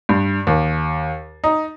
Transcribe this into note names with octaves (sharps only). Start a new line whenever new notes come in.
G2
D#2
D#4